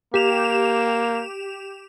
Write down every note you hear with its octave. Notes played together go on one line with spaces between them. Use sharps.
A#3 G4 E7 F7